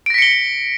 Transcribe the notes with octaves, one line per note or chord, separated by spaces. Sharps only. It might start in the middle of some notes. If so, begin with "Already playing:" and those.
A#6 B6 C#7 D7 G7